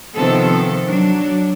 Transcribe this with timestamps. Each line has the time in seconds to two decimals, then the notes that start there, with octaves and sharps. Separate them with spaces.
0.16 C3 D#3 F3 B3 C4 A4
0.86 F#3 D4